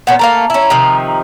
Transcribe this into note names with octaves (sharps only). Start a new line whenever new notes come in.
A#2 B3 C#4 F#5
A3 A#3 F5 A#5
C#4 E4
C3 D#3 F3
A#5